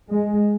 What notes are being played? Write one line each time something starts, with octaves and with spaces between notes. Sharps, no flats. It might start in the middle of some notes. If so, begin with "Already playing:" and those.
G#3